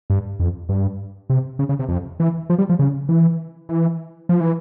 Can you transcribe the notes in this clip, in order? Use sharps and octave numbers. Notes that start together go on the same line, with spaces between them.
G2
F2
G2
C3
C#3
C#3
C3
F2
E3
F3
G3
F3
C#3
E3
E3
F3
E3